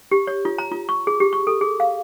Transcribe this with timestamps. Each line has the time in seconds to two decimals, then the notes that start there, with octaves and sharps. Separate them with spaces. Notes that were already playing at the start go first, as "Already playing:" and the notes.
0.11 G4
0.27 C#5
0.45 F4
0.58 A#5
0.71 F4
0.89 C#6
1.07 G#4
1.20 G4
1.33 C#6
1.47 A4
1.61 G#4
1.80 F5